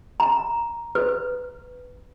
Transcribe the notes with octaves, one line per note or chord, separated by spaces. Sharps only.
A#5
B4